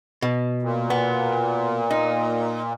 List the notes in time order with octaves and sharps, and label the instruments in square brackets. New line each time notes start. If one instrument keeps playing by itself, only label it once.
[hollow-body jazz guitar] B2
[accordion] A#2
[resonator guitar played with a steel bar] B3
D#4